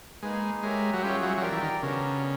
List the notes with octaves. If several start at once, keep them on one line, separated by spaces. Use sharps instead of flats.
G#3 A#3 D#4 G#4 B4
G#3 G4 A#4 C#5 E5
F#3
G3 C#4 F4 G#4 C#5 E5
F#3
F#3
F3 G4 A#4 D5 G5
E3
D#3
C#3 B3 D4 F#4 A#4